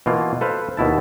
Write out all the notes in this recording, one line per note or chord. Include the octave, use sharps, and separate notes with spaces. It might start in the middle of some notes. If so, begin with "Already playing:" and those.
B2 E3 A#3 F4
A4 B4 C5 F5
D#2 B2 E4 A5